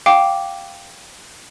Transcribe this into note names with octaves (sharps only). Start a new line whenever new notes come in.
F5 G5 D6